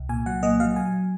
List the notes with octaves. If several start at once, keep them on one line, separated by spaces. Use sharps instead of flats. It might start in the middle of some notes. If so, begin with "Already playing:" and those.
Already playing: C2
A#2 G#5
F#3 F#5
A#3 D#5
F#3 F5
F#3 G#5